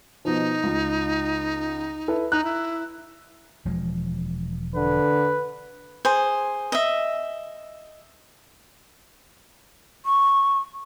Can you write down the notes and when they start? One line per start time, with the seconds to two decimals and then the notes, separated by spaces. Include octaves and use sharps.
0.25 B2 F3 D#4
0.63 C#2 F4
2.08 E4 A4 B4
2.32 D#4 A#5 F#6
2.45 E4
3.65 E1 F3 G#3
4.76 D3 B4
6.05 G#4 C5
6.72 D#5 E5
10.06 C#6